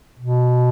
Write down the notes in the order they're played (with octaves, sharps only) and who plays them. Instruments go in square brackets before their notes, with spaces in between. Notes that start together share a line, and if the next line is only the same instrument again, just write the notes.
[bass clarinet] B2